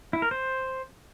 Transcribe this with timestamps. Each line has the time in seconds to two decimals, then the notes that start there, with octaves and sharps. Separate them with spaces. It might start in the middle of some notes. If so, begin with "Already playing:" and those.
0.13 E4
0.22 A#4
0.31 C5